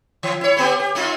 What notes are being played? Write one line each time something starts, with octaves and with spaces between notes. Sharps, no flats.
E3
E4 C#5
A3 B3 G4
G4
A3 D#4 F4